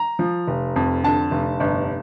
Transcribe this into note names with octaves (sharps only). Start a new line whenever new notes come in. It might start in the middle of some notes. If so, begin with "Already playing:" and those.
Already playing: A#5
F3
F1
F2
D3 A5
F1
G1